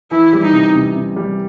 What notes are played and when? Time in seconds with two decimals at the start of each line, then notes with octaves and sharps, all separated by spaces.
0.11 E3 E4
0.33 G3
0.43 D#4
0.53 C3
0.75 C3
0.96 C3
1.16 G3